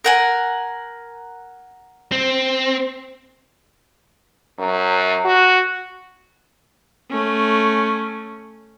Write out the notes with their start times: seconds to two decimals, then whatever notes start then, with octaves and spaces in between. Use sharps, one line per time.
0.04 A#4 F#5 G#5
2.12 C4
4.59 F#2
5.25 F#4
7.10 A3 C#4